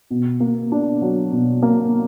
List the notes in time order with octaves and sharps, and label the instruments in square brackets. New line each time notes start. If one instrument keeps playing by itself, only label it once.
[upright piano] B2
A#3
D4
F#3
B2
A#3